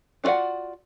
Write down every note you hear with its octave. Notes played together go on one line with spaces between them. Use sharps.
D4 F4 F#4 D5 F#5